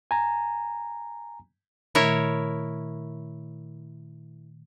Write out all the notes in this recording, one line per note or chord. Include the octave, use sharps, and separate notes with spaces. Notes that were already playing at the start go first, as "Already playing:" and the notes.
G#5 A#5
A#2 D#3 A3 E4 A#4 C#5